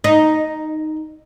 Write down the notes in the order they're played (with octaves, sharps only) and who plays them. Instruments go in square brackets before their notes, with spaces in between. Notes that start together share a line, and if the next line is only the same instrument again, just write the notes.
[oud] D#4